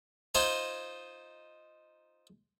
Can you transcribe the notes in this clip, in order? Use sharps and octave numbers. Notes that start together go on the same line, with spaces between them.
D#4 F4 C5 G#5 A#5